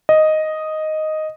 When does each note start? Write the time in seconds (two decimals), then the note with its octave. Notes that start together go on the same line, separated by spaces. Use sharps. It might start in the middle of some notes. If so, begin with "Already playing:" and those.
0.09 D#5